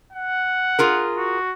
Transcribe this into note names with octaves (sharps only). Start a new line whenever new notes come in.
F#5
F4 G#4 A#4
F#4